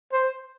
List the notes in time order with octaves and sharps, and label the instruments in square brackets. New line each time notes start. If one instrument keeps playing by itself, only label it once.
[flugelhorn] C5